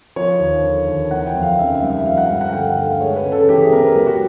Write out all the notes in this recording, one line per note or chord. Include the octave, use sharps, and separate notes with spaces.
F3 C#5
D#2
D3
D#2
E3 F#5
G5
F2
F5
C#3 E5
E5
G3
E5
F3 F5
F#5
G2 F5
F#5
D3 G5
F#5
A3
F5
G#3 C#5
B4
C#3
A4
E3 G4
G#4
B3 A#4
B4
F#3 G4
F#4